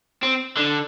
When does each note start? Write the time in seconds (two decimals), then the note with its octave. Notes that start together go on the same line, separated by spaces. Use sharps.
0.23 C4
0.57 D3